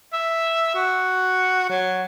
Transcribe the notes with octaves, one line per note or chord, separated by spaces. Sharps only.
E5
F#4
F#3